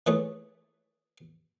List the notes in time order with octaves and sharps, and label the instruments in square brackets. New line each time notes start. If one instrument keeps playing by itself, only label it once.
[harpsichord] E3 A3 G#4 B4 C#5